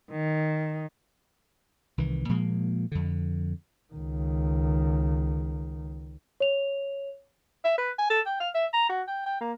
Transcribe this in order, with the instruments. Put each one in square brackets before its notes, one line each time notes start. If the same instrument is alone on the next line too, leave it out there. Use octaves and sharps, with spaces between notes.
[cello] D#3
[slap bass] C2 D#3 E3
A#2 F3 G#3 A#3
F2 D3
[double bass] C#2 D#3
[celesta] C#5 F7
[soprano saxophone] E5
B4
G#5
A4
G5
F5
E5
A#5
F#4
G5
G5
A#3